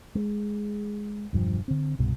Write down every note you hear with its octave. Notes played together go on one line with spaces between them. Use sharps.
G#3
E1 G2 F3
D3 C4
C2 G2 B2